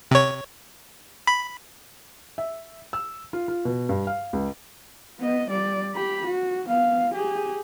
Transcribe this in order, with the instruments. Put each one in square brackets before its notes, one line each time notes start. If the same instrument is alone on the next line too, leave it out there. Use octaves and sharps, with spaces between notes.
[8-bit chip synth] C3 C#5
B5
[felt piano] E5
E6
F4
F4
B2
G2
F5
C#2
[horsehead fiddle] B3 D#5
G3 D5
G4 B5
F#4
B3 F5
G4 G#4